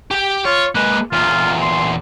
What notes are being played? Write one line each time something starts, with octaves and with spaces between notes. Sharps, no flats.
G4 G5
F4 C#5
G#3 A#3 B4
E2 A#2 F4
C6